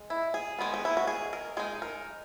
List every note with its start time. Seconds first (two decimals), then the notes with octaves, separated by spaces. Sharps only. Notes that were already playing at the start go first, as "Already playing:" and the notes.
Already playing: G#3
0.10 E4
0.34 G#4
0.59 D#3 G#3 B3
0.74 D#4
0.85 E4
0.97 F#4
1.07 G#4
1.33 A#4
1.57 G#3 D#4 G#4
1.82 A#4